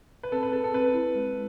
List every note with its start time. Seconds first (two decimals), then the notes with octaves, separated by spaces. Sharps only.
0.23 B4
0.32 C4 A4
0.43 B4
0.53 G#4 A4
0.64 A4
0.73 C4 B4
0.94 E4
1.15 G#3